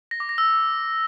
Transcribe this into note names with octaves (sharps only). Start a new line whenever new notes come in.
A#6
D6
A#6
E6